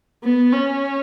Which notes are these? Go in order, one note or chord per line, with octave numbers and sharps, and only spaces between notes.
B3
C#4